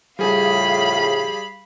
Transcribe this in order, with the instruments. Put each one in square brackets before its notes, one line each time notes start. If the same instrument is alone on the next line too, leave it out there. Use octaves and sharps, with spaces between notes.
[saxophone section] A2 C#3 F3 [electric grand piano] G3 G#4 [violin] F5 B5